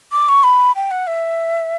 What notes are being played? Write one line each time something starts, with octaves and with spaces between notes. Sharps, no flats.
D6
C#6
B5
G5
F#5
E5